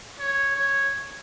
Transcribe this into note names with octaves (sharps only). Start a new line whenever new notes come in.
C#5
C#5